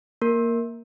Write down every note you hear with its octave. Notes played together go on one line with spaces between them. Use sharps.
A#3 A#4